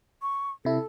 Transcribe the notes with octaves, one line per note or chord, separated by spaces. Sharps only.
C#6
C3 E4 A4